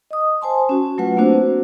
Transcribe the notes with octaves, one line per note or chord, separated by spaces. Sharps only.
D#5 D#6
C5 G#5 A5 C6
C#4 F#4
F#3 A3 F4 B4 F#5
A#3 C4 D4 F#4 C5